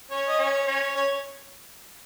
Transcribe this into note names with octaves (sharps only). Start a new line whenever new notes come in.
C#4 C#5
D#5
C#4 C#5
C#4 C#5
C#4 C#5